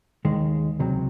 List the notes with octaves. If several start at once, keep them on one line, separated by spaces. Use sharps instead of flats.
D#2 D#3 G#3
C#2 C3 F#3